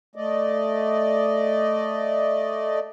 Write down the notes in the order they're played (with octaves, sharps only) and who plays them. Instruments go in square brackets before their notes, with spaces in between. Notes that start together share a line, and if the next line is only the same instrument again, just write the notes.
[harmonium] A3 D5 D#5